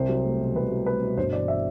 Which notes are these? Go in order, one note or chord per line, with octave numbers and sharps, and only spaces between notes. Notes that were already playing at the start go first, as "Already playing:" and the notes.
Already playing: C2 C3 C5
F#3
A3
B2
C2 B4
F#3
A3 B4
B2
G1 C5
E3 D5
E5